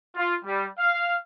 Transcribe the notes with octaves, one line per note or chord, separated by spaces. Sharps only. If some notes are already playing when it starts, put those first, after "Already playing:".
F4
G3
F5